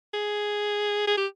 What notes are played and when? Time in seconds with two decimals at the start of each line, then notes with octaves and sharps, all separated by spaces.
0.14 G#4
1.07 G#4
1.17 G4